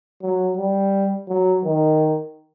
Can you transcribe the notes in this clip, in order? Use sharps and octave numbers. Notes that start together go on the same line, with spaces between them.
F#3
G3
F#3
D#3